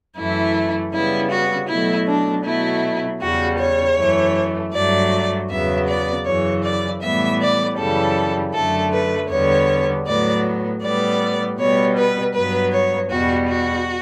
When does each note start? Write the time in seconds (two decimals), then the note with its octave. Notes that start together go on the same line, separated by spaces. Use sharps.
0.18 F#2 E3 A3 E4
0.94 C#3 G3 B3 E4
1.32 F#4
1.69 B2 F#3 A3 E4
2.08 D4
2.45 B2 F#3 A3 E4
3.23 E2 C#3 G3 F#4
3.61 C#5
3.98 F#2 E3 A3
4.74 G2 F#3 A3 D5
5.50 E2 C#3 F#3 B3 E5
5.88 D5
6.26 F#2 C#3 E3 C#5
6.64 D5
7.02 A2 E3 G3 B3 E5
7.41 D5
7.78 F#2 C#3 E3 G3 A4
8.54 F#2 D3 A3 A4
8.93 B4
9.30 E2 D3 G3 B3 C#5
10.07 A2 F#3 B3 D5
10.82 A2 G3 B3 D5
11.59 B2 G3 B3 C#5
11.98 B4
12.34 G2 F#3 B3 B4
12.73 C#5
13.11 E2 B2 G3 F#4
13.49 F#4